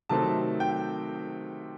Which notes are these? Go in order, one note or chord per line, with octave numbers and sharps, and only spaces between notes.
C3 D#3 F#3 A3 C4 A5
G5